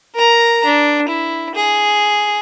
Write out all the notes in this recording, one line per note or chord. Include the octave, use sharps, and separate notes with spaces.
A#4 A#5
D4
E4
G#4